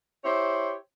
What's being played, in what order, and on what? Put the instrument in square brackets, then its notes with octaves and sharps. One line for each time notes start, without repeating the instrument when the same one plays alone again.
[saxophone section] E4 G4 C5 C#5